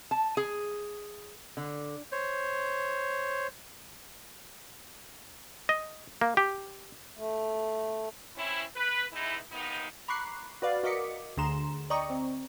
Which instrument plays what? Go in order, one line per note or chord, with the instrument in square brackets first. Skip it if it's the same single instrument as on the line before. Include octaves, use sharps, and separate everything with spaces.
[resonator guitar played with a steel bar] A5
G#4
D3
[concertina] C5 C#5
[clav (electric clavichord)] D#5
A#3
G4
[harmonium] A3
[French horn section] C4 C#4 E4
B4
E3 G#3 B3 D#4 E4
D#2 C3 D#3 B3 D#4
[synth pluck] A#5 B5 C#6 D6 F#6 C7
F#4 B4 D5 F5
F#4 A#4 D#5 D6 B6 C#7
D2 D3 G#4 A#5 C6 E7
D5 D#5 G5 A#5 C#6 D#6
C4